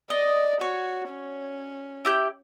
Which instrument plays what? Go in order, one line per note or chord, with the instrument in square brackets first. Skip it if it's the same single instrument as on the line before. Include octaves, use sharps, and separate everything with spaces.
[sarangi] D5 [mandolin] D#5
[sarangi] F#4 [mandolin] C#5
[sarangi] C#4
[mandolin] E4 G4 G6